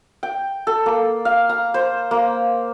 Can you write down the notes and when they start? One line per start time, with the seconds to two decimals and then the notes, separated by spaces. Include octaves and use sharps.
0.23 G5
0.67 A4
0.86 A#3
1.25 F5
1.49 A#5
1.74 C5
2.11 A#3